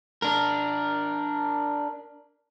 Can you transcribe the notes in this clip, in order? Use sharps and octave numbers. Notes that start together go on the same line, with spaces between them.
D4 A#4